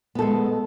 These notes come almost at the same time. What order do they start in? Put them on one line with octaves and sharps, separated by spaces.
B3 A4 G#3